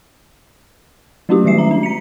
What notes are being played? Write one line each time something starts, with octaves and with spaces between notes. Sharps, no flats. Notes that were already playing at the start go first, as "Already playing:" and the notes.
F#3 A3 C#4 E4 F#4 G4
D#3 G3 G#3 E5 C7
A#5
D4
B6 C#7